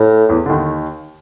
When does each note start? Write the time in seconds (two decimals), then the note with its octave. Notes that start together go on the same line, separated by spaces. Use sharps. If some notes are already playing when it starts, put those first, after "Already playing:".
Already playing: A2
0.29 E2 E3
0.46 D3
0.49 D#2 D#3